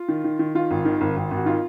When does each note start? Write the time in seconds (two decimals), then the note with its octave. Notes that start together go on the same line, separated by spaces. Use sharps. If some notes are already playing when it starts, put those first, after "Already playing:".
Already playing: F4
0.08 D#3
0.24 D#3
0.39 D#3
0.55 D#3 F4
0.71 G#1
0.85 D#3
1.01 G#1
1.16 G#1
1.31 G#1
1.37 F#4
1.46 D#3 F4